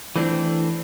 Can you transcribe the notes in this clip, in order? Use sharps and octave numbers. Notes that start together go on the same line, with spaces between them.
E3 A3 C4 D4